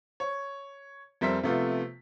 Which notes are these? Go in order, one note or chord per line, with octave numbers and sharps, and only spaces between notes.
C#5
F2 G3 A#4 C5 E5 B6
C3 F3 A3 B3 F4